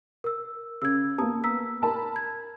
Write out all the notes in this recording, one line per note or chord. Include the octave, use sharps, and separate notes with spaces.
A#4 E6
C#3 E6 G#6
A#3 B3 A5 A#5 D#6
A#5 E6 B6
A#4 A5 B5
G#6